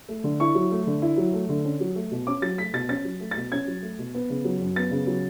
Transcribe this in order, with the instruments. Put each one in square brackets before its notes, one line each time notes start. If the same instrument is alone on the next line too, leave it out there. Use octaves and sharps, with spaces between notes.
[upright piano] A3
D3
E4 C#6
F#3
A3
D3
E4
F#3
A3
D3
C#4
F#3
A3
B2
C#4 D6
F#3 A6
A3 B6
B2 A6
C#4 A6
F#3
A3
A6
B2
C#4 G#6
F#3
A3
B2
B3
C#3
F#3
F#2
B3 A6
C#3
F#3